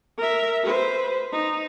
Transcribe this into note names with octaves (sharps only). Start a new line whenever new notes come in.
A#4 E5
B4 C5
D#4